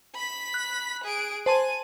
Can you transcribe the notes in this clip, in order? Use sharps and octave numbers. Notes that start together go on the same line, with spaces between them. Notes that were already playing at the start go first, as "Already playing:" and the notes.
B5 B6
F#6
G#4 D7
C5 G#5 A5 C6 D#7